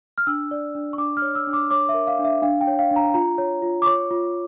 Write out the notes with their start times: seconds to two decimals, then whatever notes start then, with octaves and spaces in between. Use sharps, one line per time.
0.18 F6
0.27 D4 E6
0.51 D5
0.75 D4
0.93 C#6
0.98 D4 D6
1.17 F6
1.22 C#5
1.35 E6
1.47 D4
1.53 D6
1.71 C#5 D6
1.89 E5
1.94 A#4
2.07 F5
2.19 D4
2.24 E5
2.42 D4 F5
2.61 G5
2.67 C#5
2.79 F5
2.91 D4
2.96 A#5
3.14 F4 A#5
3.38 C#5
3.62 F4
3.82 D6
3.86 C#5 C#6
4.11 F4